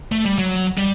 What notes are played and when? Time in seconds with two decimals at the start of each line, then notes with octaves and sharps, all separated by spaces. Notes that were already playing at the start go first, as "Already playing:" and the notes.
0.12 A3
0.25 G3
0.38 F#3
0.78 G3